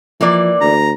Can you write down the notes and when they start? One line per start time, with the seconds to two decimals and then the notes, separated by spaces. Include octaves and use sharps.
0.21 E3 F3 A#3 D5
0.61 D2 A#5